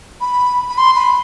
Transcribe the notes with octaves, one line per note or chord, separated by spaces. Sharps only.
B5
B5
C6
B5